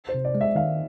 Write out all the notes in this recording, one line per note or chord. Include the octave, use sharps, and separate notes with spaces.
C5
C3
D5
G#3
E5
D#3 F5